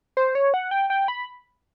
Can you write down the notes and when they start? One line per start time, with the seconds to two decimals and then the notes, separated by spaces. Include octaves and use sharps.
0.17 C5
0.35 C#5
0.54 F#5
0.71 G5
0.90 G5
1.08 B5